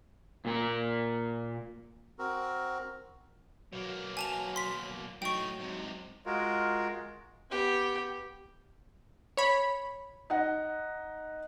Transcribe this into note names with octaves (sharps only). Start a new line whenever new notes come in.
A#2 A#3 A#4
C4 F#4 A#4
B2 F#3 A#3
G#5 A5 F7
C6 B6
A2 F#3 D#4 G5 C#6
G#2 C3
G#3 F4 F#4 A#4
B3 G4
C#5 B5
D#4 D#5 F#5